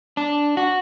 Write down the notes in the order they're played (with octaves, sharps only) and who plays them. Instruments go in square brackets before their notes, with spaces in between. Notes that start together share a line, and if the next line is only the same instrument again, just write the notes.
[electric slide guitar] D4
F#4